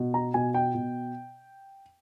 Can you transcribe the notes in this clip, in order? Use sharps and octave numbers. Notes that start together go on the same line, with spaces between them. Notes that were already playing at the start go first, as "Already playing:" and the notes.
Already playing: B2
A#5
B2 G#5
G5
B2